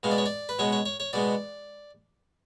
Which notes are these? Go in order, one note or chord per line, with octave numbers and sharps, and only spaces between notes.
B2 G#3 B3 F5
D5
C#5
D5
B4
B2 G#3 B3 C#5
C#5
C#5
C#5
B2 G#3 B3 D5